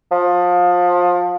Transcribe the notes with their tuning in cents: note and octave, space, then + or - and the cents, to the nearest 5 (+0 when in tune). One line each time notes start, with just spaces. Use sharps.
F3 +25